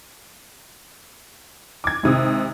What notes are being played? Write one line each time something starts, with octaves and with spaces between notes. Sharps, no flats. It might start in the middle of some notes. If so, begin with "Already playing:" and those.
D6 G#6
G#1 C3 D#6